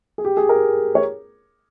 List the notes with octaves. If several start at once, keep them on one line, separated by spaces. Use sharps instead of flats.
G#4
G4
G#4
A#4
C#5